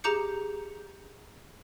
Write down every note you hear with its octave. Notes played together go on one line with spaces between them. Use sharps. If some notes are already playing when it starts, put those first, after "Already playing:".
G4 G#4 A#5 D6 G6 C#7